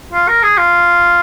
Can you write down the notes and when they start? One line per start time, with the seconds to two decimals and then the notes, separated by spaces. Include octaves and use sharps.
0.12 F4
0.28 A#4
0.43 G#4
0.57 F4